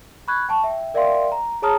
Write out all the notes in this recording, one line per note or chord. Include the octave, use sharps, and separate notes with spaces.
B5 C#6 F#6 G#6
G5 A5 C#6
E5 G5
A#4 D5 E5 F5 G5 C6
A#5
G#4 C#5 A5 A#5 D#6 F6